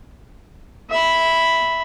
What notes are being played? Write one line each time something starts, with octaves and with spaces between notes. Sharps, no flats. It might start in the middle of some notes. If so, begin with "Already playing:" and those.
E5 B5